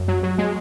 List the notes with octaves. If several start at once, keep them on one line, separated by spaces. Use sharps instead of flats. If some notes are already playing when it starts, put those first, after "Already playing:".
Already playing: F#2
F#3
F#3
G#3